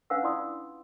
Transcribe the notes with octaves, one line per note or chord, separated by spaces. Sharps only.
C#4 D4 B4 F5 F#5 E6
E4 F4 D5 C6 D#6